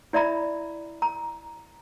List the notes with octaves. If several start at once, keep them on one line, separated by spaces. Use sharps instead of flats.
E4 D5 E5 A#5 B5
A#5